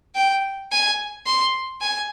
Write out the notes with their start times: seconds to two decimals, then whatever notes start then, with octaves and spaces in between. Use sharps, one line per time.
0.15 G5
0.71 G#5
1.26 C6
1.81 G#5